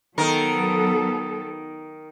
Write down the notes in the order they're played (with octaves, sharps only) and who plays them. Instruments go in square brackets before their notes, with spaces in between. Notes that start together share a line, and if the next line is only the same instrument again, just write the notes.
[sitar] D#3 A#4 [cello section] F#3 B3 A4